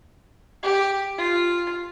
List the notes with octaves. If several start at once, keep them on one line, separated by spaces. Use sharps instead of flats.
G4
F4